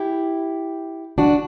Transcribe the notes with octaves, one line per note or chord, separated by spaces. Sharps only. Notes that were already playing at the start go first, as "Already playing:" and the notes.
Already playing: E4 G4
D4 F#4